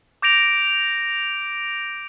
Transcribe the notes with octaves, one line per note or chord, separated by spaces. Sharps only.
D6 G6 A#6 D7 F7